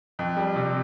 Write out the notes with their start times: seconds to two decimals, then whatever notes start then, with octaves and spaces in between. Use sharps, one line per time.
0.19 F2
0.37 G3
0.56 C3